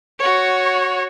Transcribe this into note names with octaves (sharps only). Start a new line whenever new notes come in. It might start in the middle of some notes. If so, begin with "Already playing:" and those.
F#4 C#5